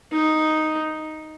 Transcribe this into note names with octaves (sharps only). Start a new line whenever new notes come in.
D#4